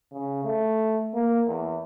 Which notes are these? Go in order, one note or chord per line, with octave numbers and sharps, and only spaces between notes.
C#3
A3
A#3
E2